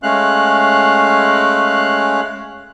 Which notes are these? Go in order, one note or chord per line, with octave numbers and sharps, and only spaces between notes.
G#3 A3 C#4 F5 F#6